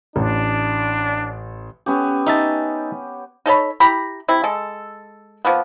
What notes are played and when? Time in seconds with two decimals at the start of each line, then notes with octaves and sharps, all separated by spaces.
0.16 A1 D4
1.86 B3 C#4 G4
2.27 D#4 E5 A5
3.46 D#4 A4 C#5 B5
3.80 E4 G4 A#5 B5
4.28 C3 E4
4.44 G#3 A4
5.45 F3 A#3 B3